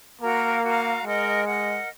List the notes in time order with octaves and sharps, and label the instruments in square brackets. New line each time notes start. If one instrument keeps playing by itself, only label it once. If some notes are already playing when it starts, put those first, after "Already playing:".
[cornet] A#3 [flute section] F#4 A#4 F5 A#5
[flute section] F#4 A#4 F5 A#5
[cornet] G#3 [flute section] A#4 D#5 F#5
[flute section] A#4 D#5 F#5